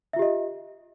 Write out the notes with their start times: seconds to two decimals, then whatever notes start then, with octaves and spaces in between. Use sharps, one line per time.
0.13 E5
0.16 F4
0.19 G4
0.22 D#5